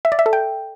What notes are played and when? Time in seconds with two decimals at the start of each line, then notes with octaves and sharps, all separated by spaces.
0.05 E5
0.12 D5
0.19 E5
0.26 A4
0.33 G5